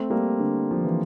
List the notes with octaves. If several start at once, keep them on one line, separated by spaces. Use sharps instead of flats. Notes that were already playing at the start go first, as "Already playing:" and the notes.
Already playing: A3 C4
G3 A#3
D3
F3
E3